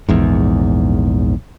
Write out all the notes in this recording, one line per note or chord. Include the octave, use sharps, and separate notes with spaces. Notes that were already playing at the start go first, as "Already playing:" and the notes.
A#1 E2 G#2